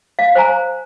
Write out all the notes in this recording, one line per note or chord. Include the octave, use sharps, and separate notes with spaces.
F5
C5 G#5 A#5